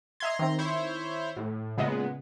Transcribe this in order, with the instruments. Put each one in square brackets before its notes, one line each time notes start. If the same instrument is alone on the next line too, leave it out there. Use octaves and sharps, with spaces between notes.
[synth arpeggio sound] D#5 E5 G#6 [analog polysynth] A#5 C6
[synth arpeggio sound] D#3 C4
[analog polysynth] E4 C5 C#5
A2
[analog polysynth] A#2 G#3 B3 [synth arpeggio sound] C#3 D#5